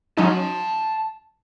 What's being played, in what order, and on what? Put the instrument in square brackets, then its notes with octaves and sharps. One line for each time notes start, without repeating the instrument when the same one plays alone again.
[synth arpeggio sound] F#3 C#4 D#4 [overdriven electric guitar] A5 C6